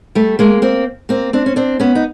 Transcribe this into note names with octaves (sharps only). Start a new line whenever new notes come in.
G3 A3
G#3 A#3
A#3 C4
A#3 C4
C4 D4
C#4
C4 D4
B3 C#4
D#4